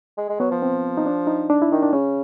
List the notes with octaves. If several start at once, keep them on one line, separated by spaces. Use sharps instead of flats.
G#3
G#3
F#3 B3
F3
C4
D#4
D4
D#4
D4
E4
D#3 D#4
D4
C#3 C#4